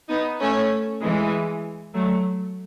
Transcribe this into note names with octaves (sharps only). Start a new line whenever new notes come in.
B3 D#4
A3 C#4
E3 G#3
F#3 A3